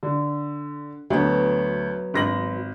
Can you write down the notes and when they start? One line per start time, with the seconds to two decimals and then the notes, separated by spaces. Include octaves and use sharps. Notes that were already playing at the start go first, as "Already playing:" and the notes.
0.03 D3
1.10 D2 F#3 B3
2.14 G#1 A#6 F#7